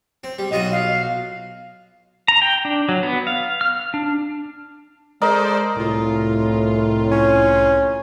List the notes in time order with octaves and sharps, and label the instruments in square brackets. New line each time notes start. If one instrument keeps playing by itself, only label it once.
[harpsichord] C4
G3
[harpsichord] B1 F4 F#4 [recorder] D#5
[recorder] F5
[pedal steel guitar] A#5
G5
D4
F#3
B3
F5
F6
D4
[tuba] G#3 [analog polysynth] A4 C5 D5 [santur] A#4 D#5
[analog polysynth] C2 F4 [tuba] A2
[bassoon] C#4